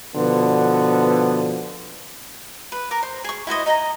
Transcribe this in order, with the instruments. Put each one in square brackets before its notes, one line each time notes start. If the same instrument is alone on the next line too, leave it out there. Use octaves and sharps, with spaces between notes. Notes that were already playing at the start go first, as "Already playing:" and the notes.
[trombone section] B2 D3 F3 B3
[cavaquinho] B4
A#4 A#5 D6
C5
G#4 C#6
E4 F#4 C5 D#5
D#4 D#5 G5 A#5